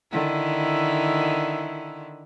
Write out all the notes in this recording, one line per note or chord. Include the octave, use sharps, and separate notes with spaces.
D3 D#3 E4